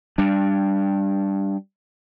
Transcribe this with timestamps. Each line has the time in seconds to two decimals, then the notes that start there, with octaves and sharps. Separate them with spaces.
0.18 G3 D4